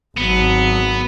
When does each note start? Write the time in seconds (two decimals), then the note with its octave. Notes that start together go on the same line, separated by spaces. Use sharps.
0.17 G#1 F#3 B3